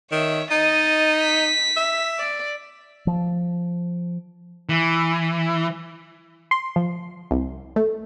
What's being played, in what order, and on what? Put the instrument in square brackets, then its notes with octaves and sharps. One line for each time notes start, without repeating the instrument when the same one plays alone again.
[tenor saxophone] D#3 [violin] C#5 E5
[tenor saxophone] D#4 [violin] D#5 A6
[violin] B6
[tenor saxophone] E5
[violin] D5
[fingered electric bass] F3
[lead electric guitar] E3
[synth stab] C6
F3
C2
A3